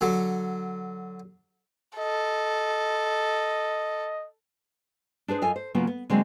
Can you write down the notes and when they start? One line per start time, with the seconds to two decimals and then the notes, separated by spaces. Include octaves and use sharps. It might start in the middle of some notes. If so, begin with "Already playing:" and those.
0.01 D3 F#3
1.98 A4 D#5
5.28 D4 G#4 B4 C5
5.42 F#2 F4 A4 D#5 F5 G#5
5.56 C5
5.74 C#3 F#3 A#3 B3 F4
5.87 B3
6.10 D3 F#3 G#3 A#3 C4